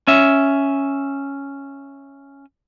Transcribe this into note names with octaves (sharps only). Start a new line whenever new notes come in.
C#4 E5